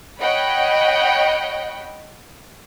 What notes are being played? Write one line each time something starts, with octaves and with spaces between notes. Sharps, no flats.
C#5 D#5 F#5 G5 B5